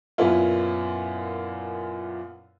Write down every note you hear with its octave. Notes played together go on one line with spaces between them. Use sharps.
F#2 A#2 B3 C#4 E4 F4